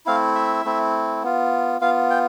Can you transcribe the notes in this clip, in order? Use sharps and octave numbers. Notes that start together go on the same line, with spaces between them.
A3 C4 E4 F5
E5
A3 C4 E4
B3 F4
B3 F4 F5
G5